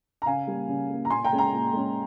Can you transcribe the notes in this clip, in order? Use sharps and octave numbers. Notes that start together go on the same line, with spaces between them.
A#5
C#3 F5 G#5
G3 A#3
C#3
G3 A#3
A#5
A#2 G#5 C6
G5 A#5
G#3 C#4
G5 A#5
A#2
G#3 C#4